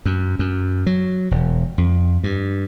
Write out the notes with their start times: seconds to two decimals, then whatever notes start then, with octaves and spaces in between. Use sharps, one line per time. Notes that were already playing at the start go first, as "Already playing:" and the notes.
0.06 F#2
0.39 F#2
0.86 F#3
1.31 E1
1.78 F2
2.24 G2